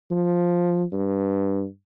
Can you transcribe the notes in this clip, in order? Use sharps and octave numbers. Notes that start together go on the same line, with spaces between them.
F3
G2